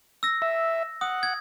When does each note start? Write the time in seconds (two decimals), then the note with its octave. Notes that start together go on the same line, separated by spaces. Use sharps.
0.23 E6 A#6
0.42 E5
1.01 F#5 D#6
1.23 G#6